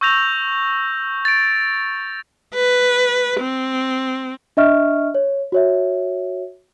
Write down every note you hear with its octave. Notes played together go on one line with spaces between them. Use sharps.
C#6 E6 G6 A#6 F7
A6 D7
B4
C4
D4 D#5 E5 C#6 F6
C#5
F#4 C#5 E5